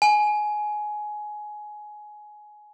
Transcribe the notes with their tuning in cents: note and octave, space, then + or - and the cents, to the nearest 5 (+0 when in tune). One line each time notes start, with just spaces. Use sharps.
G#5 +20